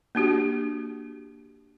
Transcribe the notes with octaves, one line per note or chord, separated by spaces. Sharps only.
A#3 D4 F#4 G4